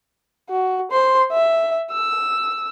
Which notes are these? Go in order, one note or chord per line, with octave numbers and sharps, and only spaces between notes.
F#4
C5 C6
E5
E6